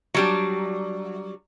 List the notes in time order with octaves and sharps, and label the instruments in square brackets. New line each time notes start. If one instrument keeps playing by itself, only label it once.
[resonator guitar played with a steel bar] F#3 G3 D4